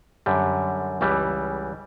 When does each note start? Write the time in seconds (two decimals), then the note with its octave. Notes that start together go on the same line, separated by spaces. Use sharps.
0.26 F#2 D3 G3
1.01 C#2 C#3 E3 G3